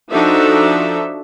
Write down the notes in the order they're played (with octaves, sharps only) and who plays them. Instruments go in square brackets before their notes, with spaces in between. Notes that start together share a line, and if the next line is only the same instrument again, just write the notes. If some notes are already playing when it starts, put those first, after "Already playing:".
[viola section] F3 D4 D#4 F#4 A4 E5